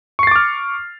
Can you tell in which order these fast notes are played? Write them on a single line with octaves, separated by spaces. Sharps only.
C#6 C7 A6 D6 F6